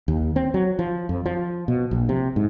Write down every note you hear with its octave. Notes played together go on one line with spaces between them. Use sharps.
D#2
C4
F#3
F3
F2
F3
B2
A#1
C3
G#2